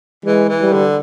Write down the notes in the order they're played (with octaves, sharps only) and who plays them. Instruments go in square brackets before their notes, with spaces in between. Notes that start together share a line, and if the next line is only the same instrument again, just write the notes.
[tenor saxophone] E3 [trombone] G#3
[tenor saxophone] E3
[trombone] G3
[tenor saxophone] D3